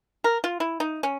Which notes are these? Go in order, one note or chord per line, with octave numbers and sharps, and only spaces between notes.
A#4
F4
E4
D#4
C#4